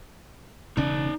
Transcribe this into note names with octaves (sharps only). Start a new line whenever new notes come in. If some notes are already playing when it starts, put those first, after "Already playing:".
E1 C#3 C#4 D#4 D5